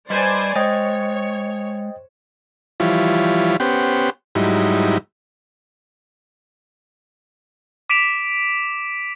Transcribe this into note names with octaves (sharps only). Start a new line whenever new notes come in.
G3 B4 C5 D5 D#5 G#5 B5
G#3 C5 C#5 D#5 G5 A6
E3 F3 G3 E4 F4 C#5
B3 C#4 G4 C5 F#5 G5
G#2 F#3 G3 D#4 E4
D6 B6 D7 E7 F7